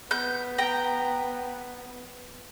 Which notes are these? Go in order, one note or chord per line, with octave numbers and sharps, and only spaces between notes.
B3 G6
G5 A#5